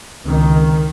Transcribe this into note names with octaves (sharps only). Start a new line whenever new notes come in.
C#2 C3 D#3